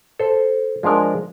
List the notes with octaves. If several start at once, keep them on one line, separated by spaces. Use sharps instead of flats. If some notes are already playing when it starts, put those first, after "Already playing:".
A4 C5
F3 G#3 D4 A#4